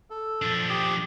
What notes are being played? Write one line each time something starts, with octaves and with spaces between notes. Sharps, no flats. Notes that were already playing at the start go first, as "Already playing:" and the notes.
A4
F3 D4
G4 D#6